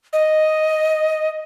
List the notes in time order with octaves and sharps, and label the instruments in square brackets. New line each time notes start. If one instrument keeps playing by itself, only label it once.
[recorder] D#5